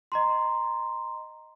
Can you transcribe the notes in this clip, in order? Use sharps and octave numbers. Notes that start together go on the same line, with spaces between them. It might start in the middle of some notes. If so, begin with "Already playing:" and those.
D#5 A#5 C6